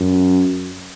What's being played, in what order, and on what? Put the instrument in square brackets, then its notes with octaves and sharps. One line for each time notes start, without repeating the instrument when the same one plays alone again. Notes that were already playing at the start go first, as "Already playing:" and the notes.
Already playing: [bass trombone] F#2